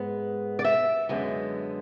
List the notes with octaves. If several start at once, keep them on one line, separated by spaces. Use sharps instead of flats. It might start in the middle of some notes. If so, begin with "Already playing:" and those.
Already playing: G#2 G#3 B3
D5
E5
F#2 D3 G#3 B3